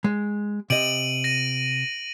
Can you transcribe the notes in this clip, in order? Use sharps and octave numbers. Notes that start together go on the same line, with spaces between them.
G#3
C3 D#5 D7 D#7 F#7
A#6 D#7